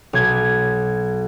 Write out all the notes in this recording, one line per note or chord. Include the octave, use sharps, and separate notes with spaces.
B1 G#6